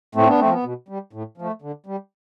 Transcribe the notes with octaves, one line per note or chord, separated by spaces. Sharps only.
A2 A3 C4
B3 D4
F3 A3 C4
B3
B2
G3
A2
F3 A3
D3
G3